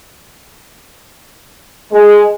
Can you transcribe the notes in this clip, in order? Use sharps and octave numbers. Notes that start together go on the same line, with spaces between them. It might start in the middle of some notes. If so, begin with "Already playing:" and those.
G#3